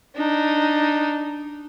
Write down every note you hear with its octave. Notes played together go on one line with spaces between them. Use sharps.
D4 D#4